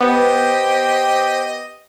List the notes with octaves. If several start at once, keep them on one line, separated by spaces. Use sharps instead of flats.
B3 G4 C5 D#5